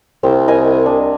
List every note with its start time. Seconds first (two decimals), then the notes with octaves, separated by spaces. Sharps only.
0.23 C2 C4
0.48 A#4 D#5 G#5
0.86 D4